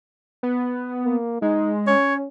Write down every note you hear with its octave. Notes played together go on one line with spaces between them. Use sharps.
B3
A#3
G#3 D#4
C#4 C#5